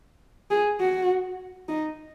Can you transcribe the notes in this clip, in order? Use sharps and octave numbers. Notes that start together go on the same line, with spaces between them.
G#4
F#4
D#4